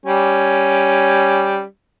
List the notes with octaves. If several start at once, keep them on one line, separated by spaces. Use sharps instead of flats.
G3 C#4